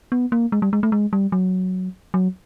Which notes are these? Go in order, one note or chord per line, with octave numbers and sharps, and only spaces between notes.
B3
A#3
G#3
G3
G#3
A3
G#3
G3
F#3
F#3